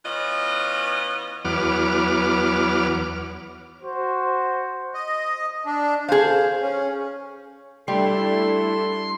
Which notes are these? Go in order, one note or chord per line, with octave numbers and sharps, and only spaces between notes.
E3 B3 C#4 F4 D#5
E2 F#3 B3 D6 F6
F#4 C5
D#5
D4
G#4 C5 F5
C#4
G3 A3 D4 E4 A4 C6